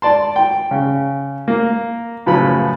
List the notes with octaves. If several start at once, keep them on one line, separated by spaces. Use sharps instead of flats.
D5 A5 C6
G5
C#3
A#3
F#2 A2 C#3 F3 B4 B5